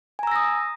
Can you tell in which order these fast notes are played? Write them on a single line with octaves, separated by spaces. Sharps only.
G#5 A#5 E6 A#6 D#6